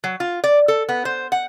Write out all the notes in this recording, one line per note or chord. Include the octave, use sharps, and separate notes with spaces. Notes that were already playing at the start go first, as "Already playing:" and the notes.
F#3
F4
D5
A4
B3
C5
F#5